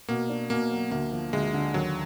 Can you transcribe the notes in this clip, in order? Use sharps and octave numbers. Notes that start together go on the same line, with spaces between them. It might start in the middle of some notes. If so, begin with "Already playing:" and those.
B2 A#3
D4
B2 A#3
F#3
D2 A#3
F3
D2 G#3
D3
D#2 F#3